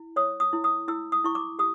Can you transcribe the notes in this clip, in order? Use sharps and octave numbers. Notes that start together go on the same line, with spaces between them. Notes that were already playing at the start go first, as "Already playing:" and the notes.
Already playing: E4
C#5 D#6
D#6
E4
D#6
E4 E6
D#6
E4 C#6
D6
G4 D#6